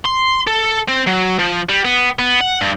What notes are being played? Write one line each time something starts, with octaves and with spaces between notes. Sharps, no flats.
C6
A4
C4
F#3
F3
G3
B3
B3
F#5
G2